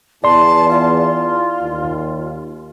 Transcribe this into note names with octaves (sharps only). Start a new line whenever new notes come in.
E2 D5 A5 C6
F4
D#2